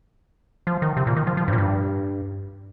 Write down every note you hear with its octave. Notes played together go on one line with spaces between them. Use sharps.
F3
D#3
C3
A#2
D#3
F3
F3
G2
A#2
G2